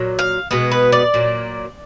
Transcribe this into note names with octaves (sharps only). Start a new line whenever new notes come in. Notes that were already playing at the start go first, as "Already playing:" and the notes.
Already playing: A#2 F#3
F5
B2 G#3 B3
B4
D5
A#2 F#3 A#3